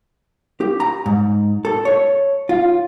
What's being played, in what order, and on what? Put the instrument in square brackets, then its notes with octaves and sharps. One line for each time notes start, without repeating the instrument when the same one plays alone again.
[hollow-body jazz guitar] G4
A#5
G#2
A4
C#5
F4